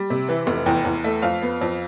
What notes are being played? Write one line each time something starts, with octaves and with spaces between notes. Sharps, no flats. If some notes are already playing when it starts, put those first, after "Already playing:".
Already playing: G3
C3
E3
F1
E2 G5
E2
A3
F2 F5
B3
F2